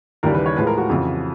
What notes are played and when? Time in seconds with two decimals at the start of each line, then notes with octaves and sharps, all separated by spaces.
0.23 D#2 C#3 E3 G3 A#4
0.35 B4
0.46 C#5
0.56 A2 F3 G#3 B4
0.67 A#4
0.78 F#4
0.90 F2 C#3 E3